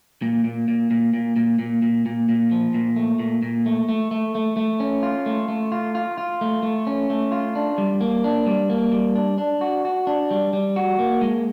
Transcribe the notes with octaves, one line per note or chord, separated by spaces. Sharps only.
A#2
A#2
A#2
A#2
A#2
A#2
A#2
A#2
A#2
A#2
F3
A#2
A3
A#2
A#2
A3
A3
A3
A3
A3
C#4
F4
A3
A3
F4
F4
F4
A3
A3
C#4
A3
F4
D4
G3
A#3
D4
G3
A#3
G3
D4
D4
F#4
F#4
D4
G3
G3
F#4
A#3
G#3